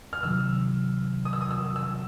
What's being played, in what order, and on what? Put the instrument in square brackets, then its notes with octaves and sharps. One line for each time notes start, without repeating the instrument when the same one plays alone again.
[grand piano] F6
[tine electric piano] C3 D#3 F#3 [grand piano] E6
[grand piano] D#6
E6
D#6
E6
E6